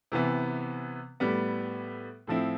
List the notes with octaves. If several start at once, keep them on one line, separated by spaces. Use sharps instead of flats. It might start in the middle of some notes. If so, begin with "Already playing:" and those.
C3 E3 B3
A2 G3 B3
A2 F3 C4 E4